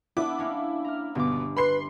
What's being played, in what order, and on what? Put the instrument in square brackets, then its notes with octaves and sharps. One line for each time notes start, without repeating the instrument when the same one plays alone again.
[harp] B3 D4 [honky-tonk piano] E4 D6
[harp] A#3 C#4 D4
A#5 F6
[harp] G1 D6 [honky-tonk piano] B2
[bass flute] B4 [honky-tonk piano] B5 C6 C7